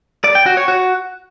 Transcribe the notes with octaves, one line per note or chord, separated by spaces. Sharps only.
D5
G5
F#4
C#5
F#4